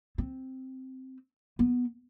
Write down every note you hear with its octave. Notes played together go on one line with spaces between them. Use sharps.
C4
B3